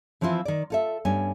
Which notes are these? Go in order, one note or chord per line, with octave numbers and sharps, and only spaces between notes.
E3 F3 C4 E4 F4
D#3 D5
F4 A4 E5
G2 B3 C#4 G#5